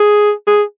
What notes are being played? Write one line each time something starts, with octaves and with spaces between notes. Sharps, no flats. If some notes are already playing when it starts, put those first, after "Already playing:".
Already playing: G#4
G#4